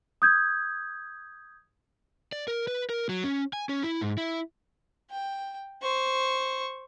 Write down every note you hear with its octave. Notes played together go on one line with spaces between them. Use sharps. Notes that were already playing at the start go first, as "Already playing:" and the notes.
D#6 G6 G#6
D5
A#4
B4
A#4
F#3
C#4
G#5
C#4
E4
G#2
E4
G5
C5 C#6